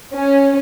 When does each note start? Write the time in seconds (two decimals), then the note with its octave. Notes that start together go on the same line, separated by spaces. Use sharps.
0.13 C#4